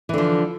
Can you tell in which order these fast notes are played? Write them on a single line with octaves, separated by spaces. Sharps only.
E3 D3 F3